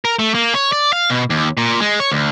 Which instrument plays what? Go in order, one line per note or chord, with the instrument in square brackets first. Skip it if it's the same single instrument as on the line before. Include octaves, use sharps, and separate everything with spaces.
[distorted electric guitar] A#4
A3
A#3
C#5
D5
F5
B2
D#2
A#2
G#3
C#5
D2